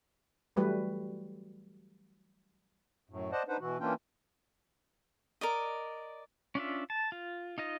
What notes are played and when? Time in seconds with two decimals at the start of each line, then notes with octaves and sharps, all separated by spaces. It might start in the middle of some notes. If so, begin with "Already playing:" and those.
0.56 E3 F#3 G3 A3 F#4 B4
3.10 F#2 A2
3.32 C5 D5 D#5 F#5 A5
3.49 D4 D#4 B4 C5 F#5
3.60 B2 E3 F#4
3.80 E3 A#3 C#4 D4 F4 G5
5.41 A#4 D5 D#5
6.55 C#4 D4 F4 E5
6.90 A5
7.12 F4
7.58 D#4 F4 D#5